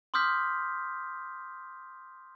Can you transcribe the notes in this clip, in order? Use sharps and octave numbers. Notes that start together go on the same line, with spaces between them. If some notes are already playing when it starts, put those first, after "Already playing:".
C6 D6 D#6 F6 G6 B6